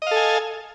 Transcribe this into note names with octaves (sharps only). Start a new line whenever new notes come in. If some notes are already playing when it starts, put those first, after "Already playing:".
A4 D#5 F5 G#5